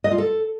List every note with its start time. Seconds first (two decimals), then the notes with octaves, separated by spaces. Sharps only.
0.04 D#5
0.11 F4
0.18 A4